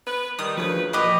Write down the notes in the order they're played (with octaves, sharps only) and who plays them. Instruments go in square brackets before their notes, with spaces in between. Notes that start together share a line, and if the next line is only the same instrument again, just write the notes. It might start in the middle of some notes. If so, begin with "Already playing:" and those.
[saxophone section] B4
[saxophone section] D#3 G3 [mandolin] D#6
[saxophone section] D2 C#3 B4 [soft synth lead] F3
[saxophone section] A#2 F#4 D#5 [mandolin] G4 B4